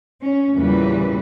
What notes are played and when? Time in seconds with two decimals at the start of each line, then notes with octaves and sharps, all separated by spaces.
0.21 C#4
0.53 E2 A#2 C#3 E3 G3 B4